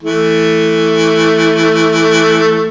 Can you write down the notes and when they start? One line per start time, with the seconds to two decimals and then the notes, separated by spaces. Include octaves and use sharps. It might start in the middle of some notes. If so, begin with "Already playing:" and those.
0.03 E3 A3